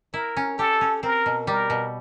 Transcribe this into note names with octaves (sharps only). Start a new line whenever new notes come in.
E4 A#4
C#4
G4 A4
C#4
C4 A#4
B2
G3 A#4
B2